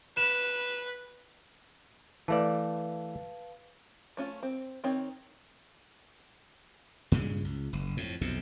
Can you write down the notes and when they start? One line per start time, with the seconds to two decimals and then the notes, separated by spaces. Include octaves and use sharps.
0.17 B4 E7
2.28 E3 A3 B4 D5 F5 A5
4.17 A3 C#4 F4
4.43 C4
4.84 D#3 C4 D#4 C#5
7.12 G2 A#2 C#3 G#3
7.44 C#2
7.73 F#1
7.97 F2 A2
8.21 B1 F2 C3